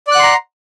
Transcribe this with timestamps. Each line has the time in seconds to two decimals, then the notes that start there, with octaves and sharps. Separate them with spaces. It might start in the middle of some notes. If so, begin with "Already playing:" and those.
0.07 D5
0.11 F#6
0.15 F#5
0.19 C6
0.23 A#5